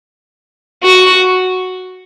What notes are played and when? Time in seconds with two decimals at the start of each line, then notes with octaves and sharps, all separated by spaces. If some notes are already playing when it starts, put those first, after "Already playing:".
0.83 F#4